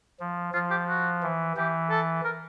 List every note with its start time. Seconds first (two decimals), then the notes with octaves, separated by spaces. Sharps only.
0.20 F3
0.54 F3 F4
0.71 G4
0.88 F#4
1.23 E3
1.57 E3 G4
1.90 A4
2.25 A#4